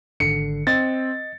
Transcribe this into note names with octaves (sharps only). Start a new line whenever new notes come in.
G#1 D3 C7 C#7
C4 D#5 A6